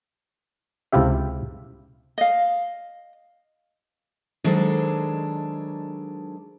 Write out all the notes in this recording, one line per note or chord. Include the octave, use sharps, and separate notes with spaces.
C#2 C3 E4 F4 G4 E5
D#5 F5
D#3 F#3 G#3 D4 A4 C5